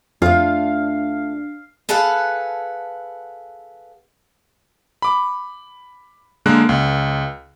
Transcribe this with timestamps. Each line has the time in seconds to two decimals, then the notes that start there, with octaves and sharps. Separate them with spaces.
0.22 F2 A3 D4 F4 F5
1.89 G#4 A4 B4 F5 F#5
5.02 B5 D6
6.46 D3 G#3 A#3 A#4 F#6
6.69 C#2